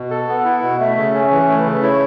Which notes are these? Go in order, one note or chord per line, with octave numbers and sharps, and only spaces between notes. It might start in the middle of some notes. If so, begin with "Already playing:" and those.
Already playing: B2
A4
B3 F#5
E4
B2
A3 E5
C#3
C#4
E3 C#5
A3
B4
C#3
E4 C#5